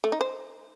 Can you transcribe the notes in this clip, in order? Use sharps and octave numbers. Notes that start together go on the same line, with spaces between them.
A3
D#4
C5